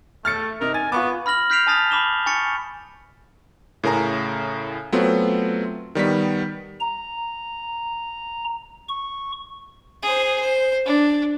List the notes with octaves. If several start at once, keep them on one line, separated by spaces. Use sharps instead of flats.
A3 F6 A6 C#7
C3 D#4 A#4
G#5 A6
B3 F4 C#6 D6
B5 F6 A#6 F#7
F6 G6 B6 C7 D7 F7
G#5 A5 D#6 A6 B6 F7
B5 D6 E7 G7
G#5 C#6 A6 C#7
A2 C#3 A#4 G#5 A#5
F#3 A3 B3 C4 F4
D#3 G3 B3 B6
A#5
C#6
G#4 C5
C5
D4